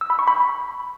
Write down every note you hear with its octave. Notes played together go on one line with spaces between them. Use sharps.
E6
B5
C#6
B5